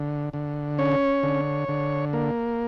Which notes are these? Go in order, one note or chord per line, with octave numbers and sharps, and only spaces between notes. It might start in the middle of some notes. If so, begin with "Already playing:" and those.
Already playing: D3
D3
C#4 C#5
D3
D3
A#3